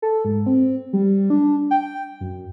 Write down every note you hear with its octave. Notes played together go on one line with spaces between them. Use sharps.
A4
G#2
C4
G3
D4
G5
F#2